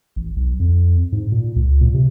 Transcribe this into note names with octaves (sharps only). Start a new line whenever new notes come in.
A1
B1
F2
G#2
A#2
C#2
A#2
C3